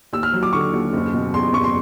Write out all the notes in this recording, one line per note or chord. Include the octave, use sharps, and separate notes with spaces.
D#2 E6
F6
F#3
D6
D3 C#6
D#2
F#1
B2
E2 C6
F#1 C#6
C6